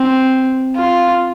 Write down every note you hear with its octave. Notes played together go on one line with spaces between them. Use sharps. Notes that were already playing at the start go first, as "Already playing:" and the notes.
Already playing: C4
F4